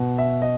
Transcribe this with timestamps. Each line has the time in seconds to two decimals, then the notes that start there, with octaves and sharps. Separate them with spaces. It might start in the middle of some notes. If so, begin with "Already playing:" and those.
Already playing: B2
0.18 E5
0.42 D#5